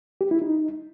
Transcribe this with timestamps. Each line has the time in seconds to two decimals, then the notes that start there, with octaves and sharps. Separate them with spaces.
0.21 G4
0.31 E4
0.42 D#4